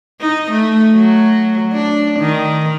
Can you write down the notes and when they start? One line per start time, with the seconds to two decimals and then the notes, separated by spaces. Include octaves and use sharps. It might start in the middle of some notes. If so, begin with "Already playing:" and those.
0.21 D#4
0.52 A3
0.95 F#3
1.73 D4
2.20 D#3